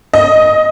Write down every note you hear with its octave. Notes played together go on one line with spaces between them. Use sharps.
D#5